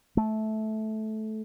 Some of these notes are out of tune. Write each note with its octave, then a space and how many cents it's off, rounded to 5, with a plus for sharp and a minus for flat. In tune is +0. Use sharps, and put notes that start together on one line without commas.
A3 -15